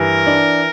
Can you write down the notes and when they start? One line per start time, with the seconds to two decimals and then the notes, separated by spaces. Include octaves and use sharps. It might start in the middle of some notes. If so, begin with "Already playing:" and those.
Already playing: G2 E3 A#4
0.27 D4